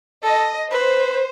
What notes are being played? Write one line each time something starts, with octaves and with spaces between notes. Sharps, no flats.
A4 D#5
B4 C5